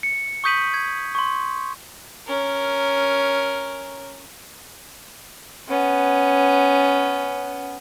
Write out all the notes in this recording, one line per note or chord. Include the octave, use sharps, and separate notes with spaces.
C#7
C#6 D#6 G6 B6 D#7 F#7
G#6
C6 C#6
C#4 A#4
B3 C#4